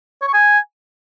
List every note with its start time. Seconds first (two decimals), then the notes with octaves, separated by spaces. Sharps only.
0.22 C#5
0.28 C#6
0.34 G#5